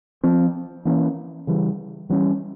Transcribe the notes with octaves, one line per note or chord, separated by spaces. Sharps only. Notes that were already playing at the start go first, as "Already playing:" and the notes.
F3 C4
E3 A#3 C#4
C#3 E3 G3
E3 G3 C#4